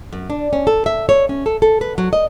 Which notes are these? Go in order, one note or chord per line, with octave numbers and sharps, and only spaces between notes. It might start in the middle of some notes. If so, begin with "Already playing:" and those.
F#2
D4
C#4
A4
E5
C#5
C#4
A4
A4
B4
F#3
D#5